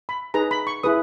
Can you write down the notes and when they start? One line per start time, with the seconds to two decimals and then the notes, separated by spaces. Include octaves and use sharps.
0.09 B5
0.34 D#4 G#4 B4 A#5
0.51 B5
0.67 C#6
0.83 E4 G#4 B4 D#6